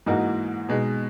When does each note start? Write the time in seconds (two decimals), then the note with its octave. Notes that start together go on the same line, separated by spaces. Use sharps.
0.06 G#2 E3 A#3 D#4 F#4
0.69 B2 G#3 D#4